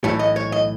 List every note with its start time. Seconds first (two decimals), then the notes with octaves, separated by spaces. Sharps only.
0.04 B1 A2 E3 C#5
0.19 D#5
0.36 C#5
0.52 D#5